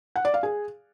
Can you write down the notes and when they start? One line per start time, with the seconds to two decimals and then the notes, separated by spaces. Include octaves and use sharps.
0.16 F#5
0.25 D5
0.34 F5
0.43 G#4